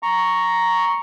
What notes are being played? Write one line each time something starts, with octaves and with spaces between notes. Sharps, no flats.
A#5 C#6